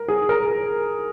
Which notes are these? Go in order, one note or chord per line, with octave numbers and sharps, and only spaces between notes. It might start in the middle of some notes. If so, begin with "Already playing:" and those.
Already playing: A#4
G#4
A#4